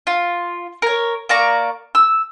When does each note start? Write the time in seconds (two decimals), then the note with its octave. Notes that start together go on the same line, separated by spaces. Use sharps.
0.07 F4
0.82 A#4 C#5
1.29 A#3 D5 A#5 C#6
1.95 E6